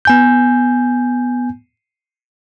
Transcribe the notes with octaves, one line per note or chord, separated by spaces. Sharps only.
B3 G#5 G6